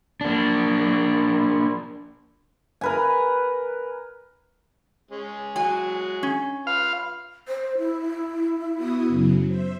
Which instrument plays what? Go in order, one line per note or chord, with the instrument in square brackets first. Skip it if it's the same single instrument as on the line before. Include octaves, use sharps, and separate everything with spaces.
[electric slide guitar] A#3 D4
[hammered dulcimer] A#4 B4 G#5
[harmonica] G#3 C#4
[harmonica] F#3 G#3 F#4 [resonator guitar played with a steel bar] G#5
[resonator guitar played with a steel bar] C#4
[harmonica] F4 B4 [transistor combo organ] F5
[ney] C5
E4
[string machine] B3 F#4 D#6
F#2 C#3 F#3
C5 E5